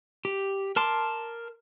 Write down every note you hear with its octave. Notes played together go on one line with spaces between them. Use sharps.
G4
A#4 A5 C6 D6